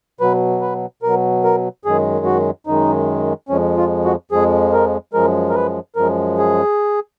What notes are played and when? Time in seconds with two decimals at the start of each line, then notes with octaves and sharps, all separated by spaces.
0.20 B2 F#3 B4
0.61 B4
1.03 B2 F#3 A#4
1.44 A#4
1.85 F#2 D#3 G#3 G#4
2.25 F#4
2.67 F#2 D#3 G#3 D#4
3.49 F2 F3 G#3 C#4
3.77 F4
4.04 F#4
4.31 F2 F3 G#3 G#4
4.73 A#4
5.13 F#2 F3 G#3 A#4
5.50 A#4
5.55 B4
5.96 F#2 F3 G#3 A#4
6.38 G#4